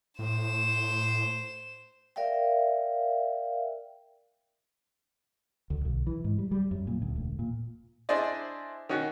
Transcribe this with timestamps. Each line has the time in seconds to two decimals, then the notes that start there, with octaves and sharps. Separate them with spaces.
0.19 A2 C5 E7
2.16 A#4 D5 E5 F5 G5
5.70 D2
5.85 B1
6.07 E3
6.24 G#2
6.38 G3
6.51 G3
6.71 F#2
6.87 A#2
7.02 D2
7.16 E1
7.39 A#2
8.09 D4 E4 G#4 C5 D5 D#5
8.89 D#3 C#4 F#4